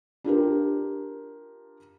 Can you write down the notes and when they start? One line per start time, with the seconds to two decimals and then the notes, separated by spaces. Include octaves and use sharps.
0.24 D4 F4 G4 A#4